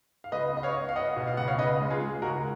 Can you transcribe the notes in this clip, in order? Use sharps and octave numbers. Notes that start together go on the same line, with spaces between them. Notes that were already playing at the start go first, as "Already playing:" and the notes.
F5
C#2 B4 D#5
B3 D#5
C#5 F5
B3
F5
B3 D#5 F#5
B2
F5
C#2 F#5
C#5 F5
C#3 B4 D#5
G#3
F4 G#4
G#3
C#2 F#4 A#4